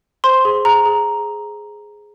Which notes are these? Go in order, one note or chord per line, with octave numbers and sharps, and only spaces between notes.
C5 C6
G#4
G#4 A#5
G#4